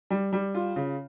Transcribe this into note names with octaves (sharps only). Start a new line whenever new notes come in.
G3
G3
F4
C#3